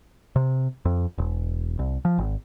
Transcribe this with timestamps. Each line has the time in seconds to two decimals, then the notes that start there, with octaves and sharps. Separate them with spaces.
0.36 C3
0.85 F2
1.18 E1
1.79 C2
2.05 F3
2.18 G#1